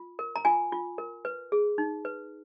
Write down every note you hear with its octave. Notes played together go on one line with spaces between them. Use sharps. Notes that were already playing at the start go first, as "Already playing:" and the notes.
Already playing: F4
A#4
A#5
F4 G#5
F4
A#4
B4
G#4
D#4
B4